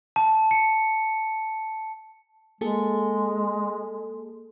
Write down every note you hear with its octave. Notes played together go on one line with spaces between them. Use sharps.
A5
C#7
G#3 A#3 G#4 A4